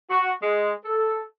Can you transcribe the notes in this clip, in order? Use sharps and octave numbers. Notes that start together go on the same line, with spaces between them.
F#4
G#3
A4